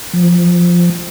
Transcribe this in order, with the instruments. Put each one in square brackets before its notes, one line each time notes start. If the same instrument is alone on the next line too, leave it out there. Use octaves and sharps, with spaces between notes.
[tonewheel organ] F3